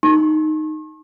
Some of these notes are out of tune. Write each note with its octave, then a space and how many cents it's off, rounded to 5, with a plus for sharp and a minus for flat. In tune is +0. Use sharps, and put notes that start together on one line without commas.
D#4 -5 C#6 -45